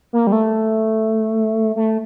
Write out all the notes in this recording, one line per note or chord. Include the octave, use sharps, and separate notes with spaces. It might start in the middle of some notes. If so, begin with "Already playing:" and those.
A#3
G3
A3
A3